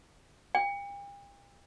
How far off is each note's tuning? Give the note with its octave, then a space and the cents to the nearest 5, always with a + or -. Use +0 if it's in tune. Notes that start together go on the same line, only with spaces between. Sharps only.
G5 +40